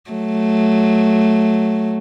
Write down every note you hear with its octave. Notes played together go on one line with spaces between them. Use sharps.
F#3 A3